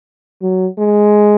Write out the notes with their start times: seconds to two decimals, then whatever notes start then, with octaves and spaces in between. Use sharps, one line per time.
0.42 F#3
0.78 G#3